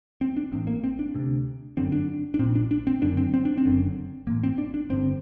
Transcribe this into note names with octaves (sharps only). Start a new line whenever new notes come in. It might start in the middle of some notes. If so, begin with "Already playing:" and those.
C4
D4
A1 A2 C4
A#3
C4
D4
D2 C3
G1 F#2 D3 C4
D4
D4
A#2 C4
A#1
D4
D4
C4
F#1 F#2 D3 D4
C4
C4
D4
C4
F#1 F#2 D3
A1 A2 A#3
C4
D4
D4
G1 G2 D3 C4